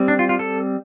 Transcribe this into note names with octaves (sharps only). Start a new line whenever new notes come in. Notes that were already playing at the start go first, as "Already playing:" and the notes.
Already playing: G3 C4
D4
F4
F4
A4